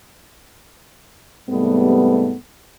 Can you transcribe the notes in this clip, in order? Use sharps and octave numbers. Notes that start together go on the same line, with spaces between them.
G#2 C3 G3 A3 B3